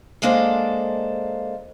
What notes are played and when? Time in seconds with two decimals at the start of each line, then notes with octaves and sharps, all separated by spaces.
0.22 G#3 A#3 D4 A4 C5